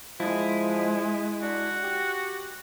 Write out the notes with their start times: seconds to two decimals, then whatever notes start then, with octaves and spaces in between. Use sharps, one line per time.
0.20 F3 G#3 E4
1.42 D4 F#4
1.84 G4